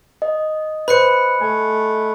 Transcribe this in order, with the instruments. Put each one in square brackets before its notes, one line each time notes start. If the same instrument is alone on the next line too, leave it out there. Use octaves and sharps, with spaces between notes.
[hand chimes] D#5
[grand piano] B4 C5 [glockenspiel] B5 F#6 C#7
[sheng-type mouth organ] A3 [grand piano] G#5